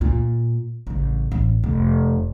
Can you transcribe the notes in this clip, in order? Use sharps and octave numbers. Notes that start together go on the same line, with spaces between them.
A#2
A1 C#3
A1
F1